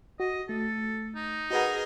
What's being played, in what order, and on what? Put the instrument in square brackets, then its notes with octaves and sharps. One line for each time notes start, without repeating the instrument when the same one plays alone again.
[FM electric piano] F#4 [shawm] D#5
[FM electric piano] A3 [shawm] A4
[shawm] D#4
[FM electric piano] F#4 B4 F#5 [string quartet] G#4 A#4 D#5